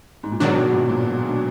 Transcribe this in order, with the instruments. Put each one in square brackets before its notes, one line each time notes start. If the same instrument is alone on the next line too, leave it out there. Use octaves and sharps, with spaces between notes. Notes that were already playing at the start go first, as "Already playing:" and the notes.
[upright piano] G#2
A#2
[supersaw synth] G#2 D#3 F#3 D4 [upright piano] B2
[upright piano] B2
A#2
A#2
B2